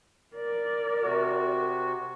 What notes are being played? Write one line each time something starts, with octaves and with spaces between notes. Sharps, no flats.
A#4 D5
C3 F#4